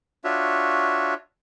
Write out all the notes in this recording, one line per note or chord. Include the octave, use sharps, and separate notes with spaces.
D4 F4 F#4 C#5 E5